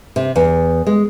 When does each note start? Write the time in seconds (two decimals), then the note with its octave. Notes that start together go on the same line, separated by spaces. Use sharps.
0.16 C3
0.36 E2
0.87 G#3